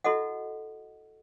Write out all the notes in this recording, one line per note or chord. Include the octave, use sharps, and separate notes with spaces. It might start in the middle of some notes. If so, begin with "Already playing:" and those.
E4 F#4 A4 D#5 F#5